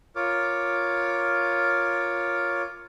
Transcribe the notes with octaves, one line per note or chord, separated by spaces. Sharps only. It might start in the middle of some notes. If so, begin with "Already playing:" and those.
F4 A#4 C#5 D6